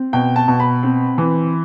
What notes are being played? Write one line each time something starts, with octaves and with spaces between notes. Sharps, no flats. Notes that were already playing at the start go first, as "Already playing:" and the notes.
Already playing: C4
B2 G5
A5
B2
B5
C4
E3